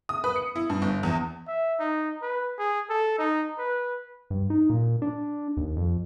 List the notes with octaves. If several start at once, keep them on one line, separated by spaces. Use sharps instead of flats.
D#6
B4
C#7
E4
G2
G1
E2
E5
D#4
B4
G#4
A4
D#4
B4
G2
D#4
A#2
D4
D#2
F2